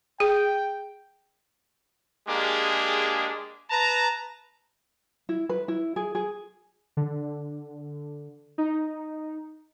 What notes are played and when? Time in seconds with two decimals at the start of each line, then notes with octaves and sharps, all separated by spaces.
0.20 G#4 G5
2.28 G#3 A#3 D4 G4 G#4
3.70 B4 A5 A#5
5.29 E4
5.49 B4
5.68 E4
5.96 G#4
6.15 G#4
6.97 D3
8.58 D#4